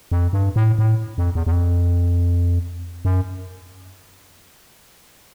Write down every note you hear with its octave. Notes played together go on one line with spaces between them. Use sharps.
F2
G2
A2
A2
F2
E2
E2
F2
F#2